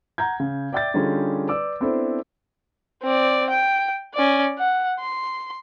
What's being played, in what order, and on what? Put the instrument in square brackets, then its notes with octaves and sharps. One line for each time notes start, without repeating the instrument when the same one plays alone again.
[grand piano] F#5 A#5 G6 G#6
C#3
D5 E5 G5 D6 G6 A6
D3 G3 C#4 D#4 F4 G#4
B4 D5 D6 E6
B3 C4 D4 E4 A4 C5
[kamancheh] C4 D5
G5
C#4 D5
F#5
C6